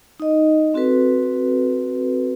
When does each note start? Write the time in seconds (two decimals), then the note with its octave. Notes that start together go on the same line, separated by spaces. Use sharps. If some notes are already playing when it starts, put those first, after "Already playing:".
0.20 D#4 D#5
0.74 C4 F#4 A4 B4